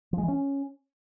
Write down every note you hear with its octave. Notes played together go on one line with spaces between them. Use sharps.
F3
G#3
E3
C#4